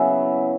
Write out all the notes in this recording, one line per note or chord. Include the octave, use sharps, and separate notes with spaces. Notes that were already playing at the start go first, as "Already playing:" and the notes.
Already playing: C#3 F#3 B3 E4